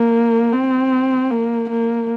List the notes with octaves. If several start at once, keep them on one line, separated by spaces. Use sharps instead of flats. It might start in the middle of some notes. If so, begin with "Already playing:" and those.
Already playing: A#3
C4
A#3
A#3